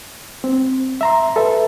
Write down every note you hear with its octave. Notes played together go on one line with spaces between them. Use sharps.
C4
E5 A#5 C6
A4 B4 E5